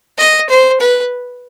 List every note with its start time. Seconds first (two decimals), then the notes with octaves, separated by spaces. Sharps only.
0.18 D#5
0.49 C5
0.80 B4